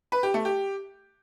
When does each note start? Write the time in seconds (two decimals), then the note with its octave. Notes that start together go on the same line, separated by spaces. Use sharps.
0.12 B4
0.23 G4
0.34 A3
0.45 G4